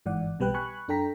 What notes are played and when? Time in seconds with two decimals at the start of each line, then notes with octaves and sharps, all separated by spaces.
0.06 G1 G#2 E3 D5 F#5
0.39 B1 B2 G3 B4 G5 F#6
0.54 G#5 B5 C#6 F#6
0.88 F#2 D4 A4 G5 A#5 B6